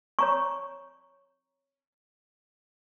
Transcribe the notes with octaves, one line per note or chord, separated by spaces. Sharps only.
C#5 A#5 C#6